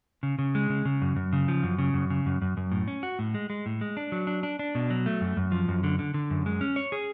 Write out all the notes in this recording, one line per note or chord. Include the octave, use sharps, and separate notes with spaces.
C#3
C#3
G#3
C#3
C#3
F#2
F#2
C#3
F3
F#2
C#3
F#2
C#3
F#2
F#2
F#2
A2
C#4
F#4
A2
G#3
G#3
A2
G#3
D4
F#3
D4
D4
D4
B2
F#3
A3
F#2
F#2
F3
F#2
D3
D3
D3
F#2
G#3
C#4
C#5
G#4